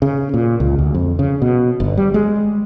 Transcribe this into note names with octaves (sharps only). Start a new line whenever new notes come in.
C#3
A#2
C#2
D2
F2
C#3
B2
G1
G3
G#3